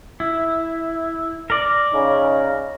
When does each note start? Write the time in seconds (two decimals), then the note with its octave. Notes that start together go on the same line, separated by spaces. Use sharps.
0.20 E4
1.50 A#4 D5
1.93 C#3 C#4 D#4